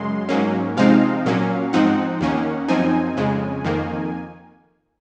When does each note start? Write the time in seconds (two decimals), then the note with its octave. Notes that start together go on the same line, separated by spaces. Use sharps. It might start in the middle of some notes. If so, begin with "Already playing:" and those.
Already playing: F#2 C#3 G#3 C6
0.29 G#2 F#3 A#3 C#4
0.77 C3 F3 G#3 C4 D#4 F5
1.26 A#2 F#3 A#3 C#4
1.73 G#2 F3 C4 D#4 F#5
2.21 D#2 D#3 A#3 C#4
2.69 F#2 F3 C4 D#4 G#5
3.17 F2 C#3 G#3
3.64 F2 D#3 A#3